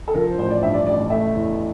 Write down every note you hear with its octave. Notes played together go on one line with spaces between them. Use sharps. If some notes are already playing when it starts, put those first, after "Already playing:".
A4
F3 A#4
C5
A1 C5
D5
G2 E5
D5
A1 D5
A3 E5
E2